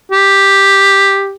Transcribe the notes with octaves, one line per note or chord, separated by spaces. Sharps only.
G4